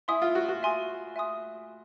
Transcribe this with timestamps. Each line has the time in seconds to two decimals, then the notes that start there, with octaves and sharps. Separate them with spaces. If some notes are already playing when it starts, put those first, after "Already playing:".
0.08 E4 E5 G#5 C6 D#6
0.22 F4
0.35 F#4
0.48 F#4
0.63 E5 G#5 C6 D#6
1.16 E5 G#5 C6 D#6